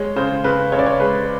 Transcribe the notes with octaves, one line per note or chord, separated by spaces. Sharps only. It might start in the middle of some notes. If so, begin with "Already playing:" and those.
Already playing: G#3 C#5
C#3 C5
C#3 B4
C#3 C#5
D5
C#5
G#3 B4